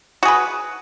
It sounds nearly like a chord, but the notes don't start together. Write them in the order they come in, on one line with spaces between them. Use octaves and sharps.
F#4 G#4 B4